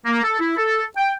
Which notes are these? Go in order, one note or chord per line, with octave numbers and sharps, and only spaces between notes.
A#3
A4
E4
A4
G5